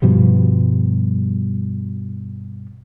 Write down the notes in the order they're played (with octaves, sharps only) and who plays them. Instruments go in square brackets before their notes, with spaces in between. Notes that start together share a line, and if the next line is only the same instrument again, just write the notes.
[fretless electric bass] G2 B2 F3 G3